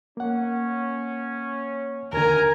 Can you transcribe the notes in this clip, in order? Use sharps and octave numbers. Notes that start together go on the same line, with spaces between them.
A#3 C#4 F#5
D#2 D3 A#4 G#5